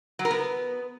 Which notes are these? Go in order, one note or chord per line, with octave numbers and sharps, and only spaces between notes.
F#3
A#4
B3